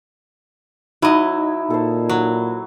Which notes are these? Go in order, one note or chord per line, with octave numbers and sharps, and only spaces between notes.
F#3 D#4 E4 D#5
A#2 A4 C5
F#3